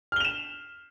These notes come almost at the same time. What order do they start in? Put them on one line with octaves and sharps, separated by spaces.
F6 G7 F7 E7